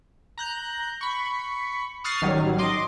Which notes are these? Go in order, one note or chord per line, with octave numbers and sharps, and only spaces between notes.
A#5 F#6 G6
B5 C#6
C#6 D#6 F6 F#6 A6 C7
A1 D#3 F#3 G3
D#5 C6 D6